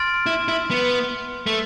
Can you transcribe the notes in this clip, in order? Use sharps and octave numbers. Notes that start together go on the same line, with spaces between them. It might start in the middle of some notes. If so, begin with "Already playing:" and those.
Already playing: C6 F6 A6 D7
E4
E4
B3
A3